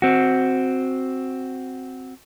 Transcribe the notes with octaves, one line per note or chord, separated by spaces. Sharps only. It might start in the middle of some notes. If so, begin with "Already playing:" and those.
C4 F#4